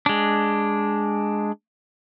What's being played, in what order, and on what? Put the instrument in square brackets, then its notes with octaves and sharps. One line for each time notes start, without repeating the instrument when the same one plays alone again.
[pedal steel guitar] G#3 D4